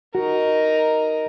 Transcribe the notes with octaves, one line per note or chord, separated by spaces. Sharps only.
D#4 F#4 A#4